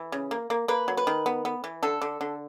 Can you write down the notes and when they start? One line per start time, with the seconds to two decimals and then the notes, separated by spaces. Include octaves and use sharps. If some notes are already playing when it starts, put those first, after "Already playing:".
Already playing: E3
0.12 C#3
0.31 A#3
0.50 A#3
0.68 A#3 B4
0.88 F#3
0.97 B4
1.07 D#3
1.26 B3
1.45 B3
1.64 E3
1.83 D3 A4
2.02 D3
2.21 D3